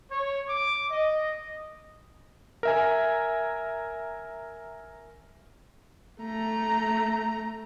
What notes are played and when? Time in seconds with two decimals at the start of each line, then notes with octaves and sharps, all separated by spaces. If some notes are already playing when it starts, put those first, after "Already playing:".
0.11 C#5
0.49 D6
0.90 D#5
2.63 A#4 E5 G#5
6.22 A3 A#5